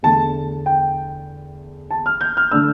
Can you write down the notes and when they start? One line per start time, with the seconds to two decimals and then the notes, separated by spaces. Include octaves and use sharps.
0.03 E2 D3 A3 A5
0.66 G5
1.91 A5
2.06 F6
2.21 G6
2.37 F6
2.51 D3 A3 D4 E6